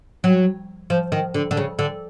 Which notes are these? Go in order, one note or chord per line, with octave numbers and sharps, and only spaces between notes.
F#3
F3
D#3
D3
D3
C#3
D3